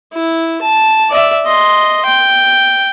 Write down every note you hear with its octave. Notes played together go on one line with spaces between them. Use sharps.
E4
A5
D5 E5
D#5 C6
G5